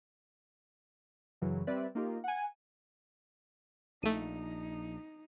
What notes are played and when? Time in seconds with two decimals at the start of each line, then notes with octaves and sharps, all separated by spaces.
1.41 F#2 C#3 E3 F#3
1.67 G3 C4 B4 D5 E5
1.95 A#3 D#4 F4 G4 A#4
2.24 F#5 G#5
4.03 A#1 A3 D#4 D#7